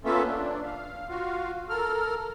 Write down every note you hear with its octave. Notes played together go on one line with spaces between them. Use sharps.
A#3 B3 C#4 F4 A4 E5
D4
F5
F4 F#4 F5
A4 A#4 F6